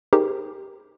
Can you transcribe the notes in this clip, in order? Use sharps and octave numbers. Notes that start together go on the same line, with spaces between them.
D#4 G4 G#4 A#4 C5